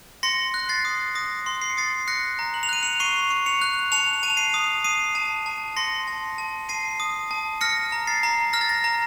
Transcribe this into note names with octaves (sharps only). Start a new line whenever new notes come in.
C6 A#6 C#7
F#6
A6 C7
D#6
D#6 A#6
C6
C7
C#7
D#6 A6 C7
F#6 A#6 C#7
A#5
F#7
F7
F#6 D#7
C#7 F7
C#6 C7 D#7
C#6
C#7 F7
F#6
A5 C#7 F7
A5 D#7
F7
C7 D#7
D#6
D#6 C7 D#7
A5
A5
C6 A#6 C#7
A5
A5
A5 C7 D#7
D#6
A5
F6 A#6 C#7
A#5
A6 C7
A#5
F6 A#6
A6
A#6
A#5